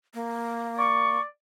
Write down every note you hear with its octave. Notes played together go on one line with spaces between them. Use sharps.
A#3
D5 C#6